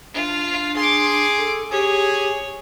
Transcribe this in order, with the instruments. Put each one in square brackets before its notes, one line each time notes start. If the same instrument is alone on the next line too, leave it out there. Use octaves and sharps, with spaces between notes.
[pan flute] D4 [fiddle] F4
[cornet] G#4 [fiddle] C6 D6
[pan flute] A4
[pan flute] G4 [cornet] G#4 [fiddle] C#5